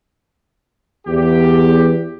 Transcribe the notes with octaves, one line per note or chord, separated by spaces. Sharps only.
E2 G4